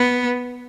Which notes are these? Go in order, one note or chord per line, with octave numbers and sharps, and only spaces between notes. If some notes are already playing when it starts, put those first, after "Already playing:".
Already playing: B3